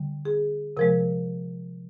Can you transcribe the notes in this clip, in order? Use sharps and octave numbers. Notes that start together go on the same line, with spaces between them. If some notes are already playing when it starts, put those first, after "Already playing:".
Already playing: D3 G3
G#4
C3 F3 G#3 A#4